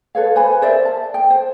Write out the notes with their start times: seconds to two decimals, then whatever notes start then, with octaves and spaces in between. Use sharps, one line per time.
0.15 A4 B4 C#5 F5
0.35 B4 C5 G#5 B5
0.62 A#4 C5 D5 E5
0.85 A5
1.14 G5
1.30 C5